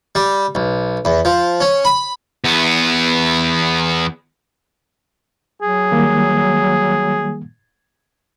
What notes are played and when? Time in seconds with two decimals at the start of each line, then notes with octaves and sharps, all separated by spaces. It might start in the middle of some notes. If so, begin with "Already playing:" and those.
0.15 G3
0.55 B1
1.05 E2
1.25 F3
1.61 C#4
1.85 B5
2.44 E2 B3
5.62 F#3 G#4
5.92 D#3 G3 A#3